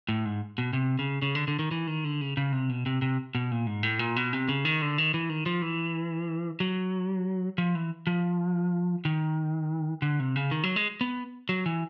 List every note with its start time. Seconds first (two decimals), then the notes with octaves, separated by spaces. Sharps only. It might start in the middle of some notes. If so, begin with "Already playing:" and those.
0.09 A2
0.25 G#2
0.58 B2
0.73 C3
0.99 C#3
1.22 C#3
1.35 D3
1.48 D3
1.59 D#3
1.71 E3
1.87 D#3
2.04 D3
2.21 C#3
2.37 C#3
2.52 C3
2.69 B2
2.86 C3
3.02 C3
3.35 B2
3.51 A#2
3.67 G#2
3.83 A2
3.99 A#2
4.16 B2
4.33 C3
4.49 C#3
4.65 D#3
4.82 D3
4.98 D#3
5.14 E3
5.30 D#3
5.46 F3
5.62 E3
6.60 F#3
7.58 F3
7.75 E3
8.07 F3
9.05 D#3
10.02 D3
10.20 C3
10.36 C#3
10.51 D#3
10.64 F#3
10.76 G#3
11.01 B3
11.49 F#3
11.66 E3